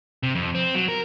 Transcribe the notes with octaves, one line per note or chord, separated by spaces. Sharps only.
C3
F2
C4
F#3
A#4